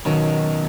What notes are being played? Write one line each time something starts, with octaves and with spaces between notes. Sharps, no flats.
B1 B2 D#3 F#3 C#4